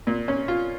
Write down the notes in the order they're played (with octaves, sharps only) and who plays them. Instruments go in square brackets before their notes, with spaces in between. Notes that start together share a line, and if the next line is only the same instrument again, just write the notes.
[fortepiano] A#2
C#4
F4